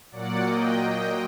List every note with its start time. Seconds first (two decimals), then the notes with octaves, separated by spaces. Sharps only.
0.11 A#2 F#3 A#3 D5 F#5
0.45 D#5 G5